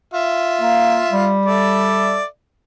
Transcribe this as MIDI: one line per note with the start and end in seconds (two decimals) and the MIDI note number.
0.14 1.33 65
0.14 1.33 76
0.61 1.00 58
1.12 2.19 55
1.46 2.25 69
1.46 2.25 74
1.46 2.25 76